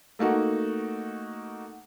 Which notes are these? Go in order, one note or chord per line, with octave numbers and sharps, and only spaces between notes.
A3 A#3 D#4 F#4